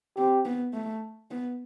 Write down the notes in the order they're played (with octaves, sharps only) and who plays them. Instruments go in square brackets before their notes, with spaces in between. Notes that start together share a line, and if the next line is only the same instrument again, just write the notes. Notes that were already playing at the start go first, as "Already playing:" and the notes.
[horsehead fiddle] C4 [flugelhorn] G4
[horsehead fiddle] B3
A3
B3